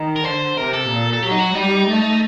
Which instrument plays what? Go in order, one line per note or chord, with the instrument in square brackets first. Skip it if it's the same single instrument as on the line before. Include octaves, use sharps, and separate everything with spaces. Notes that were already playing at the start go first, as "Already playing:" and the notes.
Already playing: [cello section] D#3
[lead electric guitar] A#4
[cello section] D3 [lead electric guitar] C5
[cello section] C3 [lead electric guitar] A#4
[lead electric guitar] A4
[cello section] A#2
[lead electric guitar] A4
[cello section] F#3 [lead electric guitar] G4
[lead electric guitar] D#4
F#4
[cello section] G3 [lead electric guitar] D#4
[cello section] A3